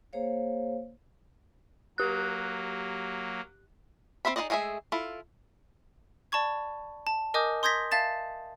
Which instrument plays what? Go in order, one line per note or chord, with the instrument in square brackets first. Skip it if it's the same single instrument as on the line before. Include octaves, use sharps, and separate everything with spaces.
[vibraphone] A#3 G#4 C5 C#5 F5
[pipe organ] F#3 A#3 [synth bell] G4 F#6
[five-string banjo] C4 A4 C5 E5 B5
D#4 G#4 C5 D5 D#5
G#3 A3 G#4 A#4 E5
E4 F4 A4
[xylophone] D5 A5 B5 C#6 G#6
A5
A#4 D#5 G#5 D6 D#6 G6
C6 D#6 G6 G#6 A#6 B6
E5 F5 A5 A6 E7